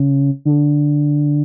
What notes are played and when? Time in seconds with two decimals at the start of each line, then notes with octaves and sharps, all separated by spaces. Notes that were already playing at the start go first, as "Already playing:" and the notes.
Already playing: C#3
0.45 D3